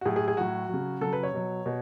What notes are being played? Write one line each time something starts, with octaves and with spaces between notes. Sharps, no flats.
F#4
A2 F#3 G#4
G#4
G#4
A2 F#3 F#4
C#3 F#3
C#3 F#3 A4
B4
C#5
B2 F#3
B2